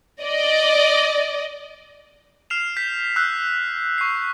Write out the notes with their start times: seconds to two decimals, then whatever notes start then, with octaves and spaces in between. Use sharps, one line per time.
0.22 D5 D#5
2.50 F6 C7 E7 F7
2.76 G6 B6
3.16 E6 F#6 G6 B6
3.98 C#6 C7